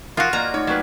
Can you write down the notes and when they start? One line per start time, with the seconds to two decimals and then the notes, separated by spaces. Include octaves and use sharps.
0.17 F3 F4 F#4 A#4 F5
0.33 A#3 D5 D#5 F#5 A#5
0.54 A3 D#4 C#5
0.67 F#3 A#3 B4 D5 G5 F#6